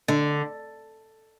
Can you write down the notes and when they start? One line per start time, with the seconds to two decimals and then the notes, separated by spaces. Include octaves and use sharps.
0.08 D3